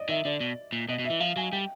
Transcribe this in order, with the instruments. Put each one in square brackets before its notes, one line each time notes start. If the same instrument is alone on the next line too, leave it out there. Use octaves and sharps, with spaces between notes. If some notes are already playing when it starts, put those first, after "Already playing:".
Already playing: [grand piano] D5 D#5
[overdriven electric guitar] D#3 [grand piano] E5
[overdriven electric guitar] D3 [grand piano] D5
[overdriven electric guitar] B2
A#2
[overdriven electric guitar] B2 [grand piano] D#5
[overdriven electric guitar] B2
[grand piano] E5
[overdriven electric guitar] E3
[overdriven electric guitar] F3 [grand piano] F5
[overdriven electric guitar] F#3 [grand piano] G#5
[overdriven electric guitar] G3 [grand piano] G5